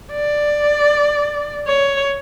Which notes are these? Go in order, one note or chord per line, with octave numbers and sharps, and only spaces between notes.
D5
C#5